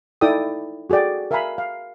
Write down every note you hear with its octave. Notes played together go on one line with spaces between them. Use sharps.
D#4 E4 A4 D5 G5 D#6
F#4 G#4 A4 D5 G5
A#4 E5 F5 G#5 A#5 B5
F5